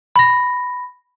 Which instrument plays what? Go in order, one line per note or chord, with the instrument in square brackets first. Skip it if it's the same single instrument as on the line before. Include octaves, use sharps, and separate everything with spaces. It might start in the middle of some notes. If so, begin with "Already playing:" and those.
[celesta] B5 A#6